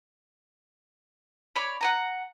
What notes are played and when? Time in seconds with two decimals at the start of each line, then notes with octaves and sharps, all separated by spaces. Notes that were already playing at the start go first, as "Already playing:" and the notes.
1.56 C#5 D5 B5
1.81 F#5 G#5 A#5